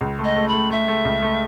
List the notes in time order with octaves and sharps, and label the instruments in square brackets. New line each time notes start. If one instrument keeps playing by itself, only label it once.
[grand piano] C#2
A3
[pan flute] D#5
[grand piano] A3
[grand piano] A3 [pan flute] B5
[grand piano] A3 [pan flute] E5
[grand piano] A3
C#2
A3